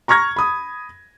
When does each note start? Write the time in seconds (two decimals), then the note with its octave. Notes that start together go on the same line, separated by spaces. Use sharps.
0.08 A#5 C#6 F6 G#6 A#6
0.36 B5 D#6